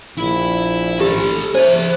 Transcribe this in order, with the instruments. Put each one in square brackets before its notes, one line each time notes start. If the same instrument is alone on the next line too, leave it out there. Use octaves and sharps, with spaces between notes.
[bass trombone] A#1 [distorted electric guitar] E4
[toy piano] G4 [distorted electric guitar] A4 B4
[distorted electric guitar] G#4 E5 [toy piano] C5